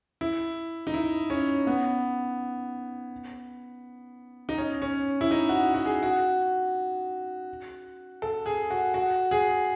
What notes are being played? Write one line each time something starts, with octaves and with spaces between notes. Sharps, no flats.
E4
D#4
E4
C#4
B3
D#4
C#4
C#4
E4
D#4
F#4
F#4
G#4
F#4
A4
G#4
F#4
F#4
G#4